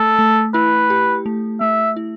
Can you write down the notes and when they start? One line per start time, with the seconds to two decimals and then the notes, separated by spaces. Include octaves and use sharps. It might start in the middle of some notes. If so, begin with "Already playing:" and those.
Already playing: A3 A4
0.19 A3
0.54 E4 B4
0.90 G4
1.26 A3
1.61 A3 E5
1.96 E4